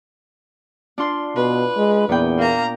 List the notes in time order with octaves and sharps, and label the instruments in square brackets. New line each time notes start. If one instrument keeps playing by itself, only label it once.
[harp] D4 F4 C6
[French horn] B2 [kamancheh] B4
[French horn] G#3
[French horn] E2 [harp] A#2 B3 G5
[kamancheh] A#3 A#5